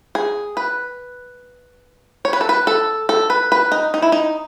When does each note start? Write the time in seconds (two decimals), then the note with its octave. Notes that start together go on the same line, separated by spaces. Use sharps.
0.15 G#4
0.57 B4
2.25 C#5
2.33 B4
2.41 A4
2.49 B4
2.67 A4
3.09 A4
3.30 B4
3.52 B4
3.72 D#4
3.94 D#4
4.02 E4
4.12 D#4